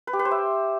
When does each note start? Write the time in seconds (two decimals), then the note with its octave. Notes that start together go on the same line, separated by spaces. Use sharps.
0.07 B4
0.13 G4
0.19 B4
0.25 C5
0.31 E5